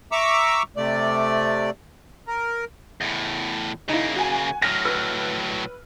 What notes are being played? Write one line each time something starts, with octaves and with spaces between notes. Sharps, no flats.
E5 A#5 C#6 D6 E6
C3 A3 D5
A#4
E2 A2
C#3 A#3 D#4 E4
F#4 G#5
A2 F#3 F6 A#6
B4 E6 F6